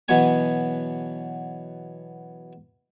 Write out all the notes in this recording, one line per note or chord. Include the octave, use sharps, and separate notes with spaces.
B2 E3 F#3 B3 C#5 G#5